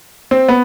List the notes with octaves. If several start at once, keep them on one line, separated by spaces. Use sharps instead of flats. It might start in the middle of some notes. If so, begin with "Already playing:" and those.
C4
B3